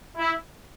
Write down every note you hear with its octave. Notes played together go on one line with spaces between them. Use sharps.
E4